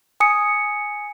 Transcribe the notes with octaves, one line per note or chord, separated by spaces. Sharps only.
G#5 D#6 C#7